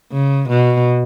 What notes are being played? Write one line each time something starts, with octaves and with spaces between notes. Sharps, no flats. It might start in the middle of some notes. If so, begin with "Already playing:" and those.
C#3
B2